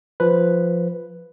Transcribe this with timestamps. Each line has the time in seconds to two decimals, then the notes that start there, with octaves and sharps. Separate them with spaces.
0.20 F3 B4